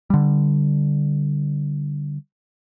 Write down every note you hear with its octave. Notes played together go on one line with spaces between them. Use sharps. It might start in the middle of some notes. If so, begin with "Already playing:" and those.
D3 G3